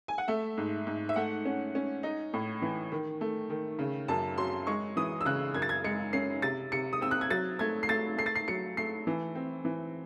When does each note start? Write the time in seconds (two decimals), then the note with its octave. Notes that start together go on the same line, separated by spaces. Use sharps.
0.08 G#5
0.18 F#5
0.28 A3 E5
0.58 G#2
0.87 G#2
1.09 E5
1.16 A3 F#5
1.45 C#4
1.75 C#4
2.03 D#4
2.33 A2
2.62 E3
2.92 D#3
3.21 A3
3.50 D#3
3.79 C#3
4.08 F#2 A5
4.38 F#3 C6
4.67 G#3 C#6
4.97 E3 D#6
5.21 E6
5.25 C#3 F#6
5.54 F#2 G#6
5.62 A6
5.69 G#6
5.84 G#3 C#7
6.13 C#4 C7
6.42 C3 A6
6.72 C3 C#7
6.93 D#6
7.01 C4 E6
7.11 F#6
7.21 G#6
7.30 F#3 A6
7.59 A3 G#6
7.83 C7
7.89 A3 A6
8.18 A3 C7
8.26 A6
8.35 C7
8.48 F#3 C#7
8.77 A3 C7
9.07 E3
9.35 C4
9.65 E3